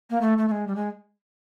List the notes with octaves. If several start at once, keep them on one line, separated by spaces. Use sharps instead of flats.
A#3
A3
A3
A3
G#3
G3
G#3